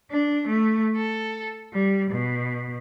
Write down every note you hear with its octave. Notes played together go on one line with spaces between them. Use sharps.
D4
A3
A4
G3
B2